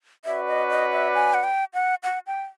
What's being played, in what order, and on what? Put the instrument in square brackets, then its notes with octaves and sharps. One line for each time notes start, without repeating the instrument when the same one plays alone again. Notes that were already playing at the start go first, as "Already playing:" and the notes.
[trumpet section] C#4 F#4 B4 D5 [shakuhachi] E5
[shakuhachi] D#5
D#5
E5
G#5
F#5
G5
F#5
F#5
G5